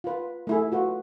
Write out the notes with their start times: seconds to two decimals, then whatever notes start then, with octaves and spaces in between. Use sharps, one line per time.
0.04 F4 B4
0.47 A3 E4 G#4
0.72 F4 F#4 B4